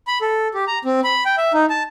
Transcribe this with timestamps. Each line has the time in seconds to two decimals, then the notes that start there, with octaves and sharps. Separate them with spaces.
0.07 B5
0.21 A4
0.54 G4
0.67 A#5
0.85 C4
1.04 B5
1.25 G5
1.38 E5
1.54 D#4
1.70 A5